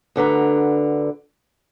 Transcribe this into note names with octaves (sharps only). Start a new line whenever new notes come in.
D2 D3 B4 A#5